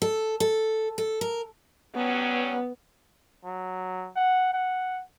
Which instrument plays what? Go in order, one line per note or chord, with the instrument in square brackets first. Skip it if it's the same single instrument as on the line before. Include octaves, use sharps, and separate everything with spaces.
[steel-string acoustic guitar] A4
A4
A4
A#4
[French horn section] F#3 G3 C#4 [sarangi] B3
[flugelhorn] F#3
F#5
F#5